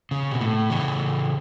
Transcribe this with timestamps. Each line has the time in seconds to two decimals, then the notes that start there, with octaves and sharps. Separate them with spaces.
0.11 C#3
0.31 B2
0.41 A2
0.70 C#3 E3